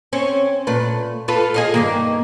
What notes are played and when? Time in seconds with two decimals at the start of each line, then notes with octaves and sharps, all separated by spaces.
0.13 C4 C#4
0.67 A#2 A3 B4
1.28 F4 A4 B4
1.54 G#4 D#5 F5
1.74 G2 D#3 A#3